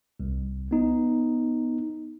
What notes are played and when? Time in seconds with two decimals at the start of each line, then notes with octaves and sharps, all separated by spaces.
0.20 C2
0.71 B3 D#4